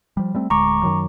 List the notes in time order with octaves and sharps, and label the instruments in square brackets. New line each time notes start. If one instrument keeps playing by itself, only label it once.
[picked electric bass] F3 G3
G3 A3 C4
[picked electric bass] D1 D2 G#3 [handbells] A#5 C#6 D6
[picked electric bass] F#2 D#3 F#3